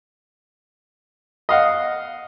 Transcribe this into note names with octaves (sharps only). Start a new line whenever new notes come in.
D#5 F5 F#5